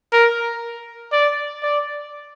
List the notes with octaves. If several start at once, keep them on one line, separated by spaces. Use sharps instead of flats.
A#4
D5
D5